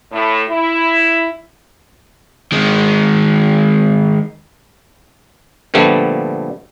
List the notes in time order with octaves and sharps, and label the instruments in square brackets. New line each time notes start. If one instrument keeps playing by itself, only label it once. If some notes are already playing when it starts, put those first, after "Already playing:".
[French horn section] A2
E4
[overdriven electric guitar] D#3 G#3
[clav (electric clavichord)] A#2 D3 F3 G3 A3 B3